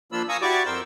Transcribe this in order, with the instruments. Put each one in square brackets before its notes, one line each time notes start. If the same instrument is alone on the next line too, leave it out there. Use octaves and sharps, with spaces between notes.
[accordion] F3 A#3 D4 F4 B5 E6
F5 G#5 A#5 C#6 D#6 E6
E4 F#4 G4 D5 C#6 D6
F2 A#4 C5 G5 E6